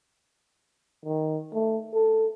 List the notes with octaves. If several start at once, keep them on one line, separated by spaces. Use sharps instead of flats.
D#3
A3
A4